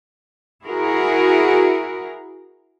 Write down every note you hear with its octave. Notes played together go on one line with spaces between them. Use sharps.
E4 F#4 G#4 A#4